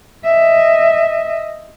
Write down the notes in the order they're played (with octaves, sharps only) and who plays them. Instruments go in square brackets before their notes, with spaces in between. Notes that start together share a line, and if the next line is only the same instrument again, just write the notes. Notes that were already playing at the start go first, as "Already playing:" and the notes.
[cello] D#5 E5